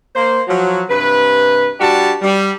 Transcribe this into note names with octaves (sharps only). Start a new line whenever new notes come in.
A#3 C5
F3 F#3
G2 C3 B4
G3 D4 F#4 G4 A5
G3